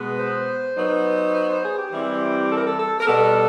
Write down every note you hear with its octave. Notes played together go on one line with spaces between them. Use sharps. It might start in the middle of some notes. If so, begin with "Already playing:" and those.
Already playing: B2 G#3 B3
C5
F#3 B3 D#4
C5
C5
G#4
G4
E3 G3 C4 E4
A4
A#4
A4
A4
A#4
B2 G3 B3 A4